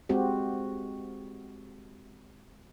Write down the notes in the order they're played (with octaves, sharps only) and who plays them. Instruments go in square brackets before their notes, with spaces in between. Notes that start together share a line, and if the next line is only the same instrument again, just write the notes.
[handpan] G#3 C4 F#4 G4